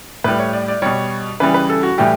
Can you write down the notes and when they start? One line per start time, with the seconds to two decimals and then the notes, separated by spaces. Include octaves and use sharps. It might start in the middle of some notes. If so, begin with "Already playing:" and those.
0.24 A2 G3 B4
0.39 C#5
0.53 D5
0.68 D5
0.82 B2 G3 C#5
1.40 C#3 E3 G3 B4
1.54 B4
1.69 A4
1.83 F#4
1.98 A2 E3 G3 G4